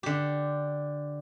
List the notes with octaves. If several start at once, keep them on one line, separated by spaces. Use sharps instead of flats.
D3 G4